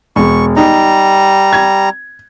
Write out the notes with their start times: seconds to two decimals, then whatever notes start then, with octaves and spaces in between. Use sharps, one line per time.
0.16 E1 C#6
0.56 G3 D#4 A#5
1.53 G#6